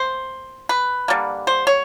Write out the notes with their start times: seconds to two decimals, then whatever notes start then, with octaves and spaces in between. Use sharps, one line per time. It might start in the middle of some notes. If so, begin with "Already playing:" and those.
Already playing: A#3 C5
0.69 B4
1.08 D3 G3 A#3
1.47 C5
1.67 C#5